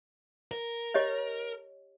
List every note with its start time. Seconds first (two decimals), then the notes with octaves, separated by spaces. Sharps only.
0.51 A#4
0.94 G4 C#5 D#5